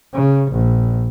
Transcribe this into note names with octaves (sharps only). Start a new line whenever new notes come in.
C#3
A#1